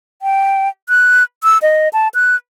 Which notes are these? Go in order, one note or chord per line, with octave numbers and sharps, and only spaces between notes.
G5
F#6
E6
D#5
A5
F#6